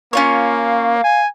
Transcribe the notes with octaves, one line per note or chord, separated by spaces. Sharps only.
A#3 C#4 F4 C#5
F5
G#5